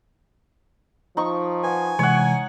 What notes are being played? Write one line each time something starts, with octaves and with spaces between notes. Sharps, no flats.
F3 D#4 C#6
B4 F#5 G#5
C3 E3 G#3 C#5 F#5